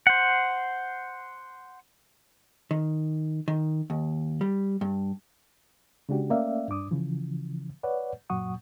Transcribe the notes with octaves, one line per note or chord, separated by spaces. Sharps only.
C5 F#5
D#3
D#3
D#2
G3
G2
C#3 G#3 D4 F#4 G4
A3 A#3 C#4 D5 E5 F5
G2 D4 D6 D#6
C#3 E3 F3
B4 C#5 D5 F#5
F#2 A#2 F#3 F#5 C#6 D#6